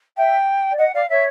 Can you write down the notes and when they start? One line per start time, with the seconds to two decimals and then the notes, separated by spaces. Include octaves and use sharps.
0.17 E5 G5
0.71 D5
0.78 D#5 F#5
0.94 D5 F5
1.10 C#5 E5